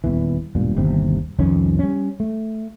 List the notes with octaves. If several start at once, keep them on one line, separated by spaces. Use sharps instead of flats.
D#1 E2 E3
E1 G2 A#2
G1 D#2 C3 C4
C2 F2 D#3 C#4
G3 C#4
A3